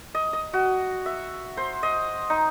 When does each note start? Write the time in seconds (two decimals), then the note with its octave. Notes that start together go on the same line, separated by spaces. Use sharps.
0.15 D#5
0.33 D#5
0.54 F#4
1.06 E5
1.57 C5
1.83 D#5
2.30 D#4